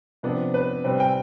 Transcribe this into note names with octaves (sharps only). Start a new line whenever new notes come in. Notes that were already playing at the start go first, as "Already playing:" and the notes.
C3 F3 B3 D4
B4
C3 G3 C4 B4
G5